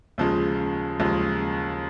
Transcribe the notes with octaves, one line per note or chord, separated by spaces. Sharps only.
D#2 C#3 F3 G#3
D#2 C#3 F3 G#3